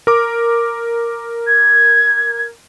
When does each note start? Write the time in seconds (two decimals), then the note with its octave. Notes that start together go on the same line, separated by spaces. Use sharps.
0.07 A#4 D6
1.47 G#6